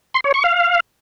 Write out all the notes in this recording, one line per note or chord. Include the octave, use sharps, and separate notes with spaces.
C6
C#5
C#6
F5